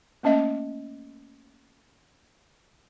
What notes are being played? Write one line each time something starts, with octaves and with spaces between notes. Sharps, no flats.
A3 A#3 C#4 D#5 E5